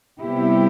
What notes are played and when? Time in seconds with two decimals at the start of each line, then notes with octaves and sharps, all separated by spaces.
0.22 C3 G3 B3 E4 G4